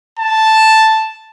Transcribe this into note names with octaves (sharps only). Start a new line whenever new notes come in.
A5